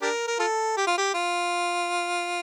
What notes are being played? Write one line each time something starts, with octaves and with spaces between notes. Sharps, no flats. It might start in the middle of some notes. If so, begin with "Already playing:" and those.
D4 G4 A#4
A#4
F4 A4
G4
F4
G4
F4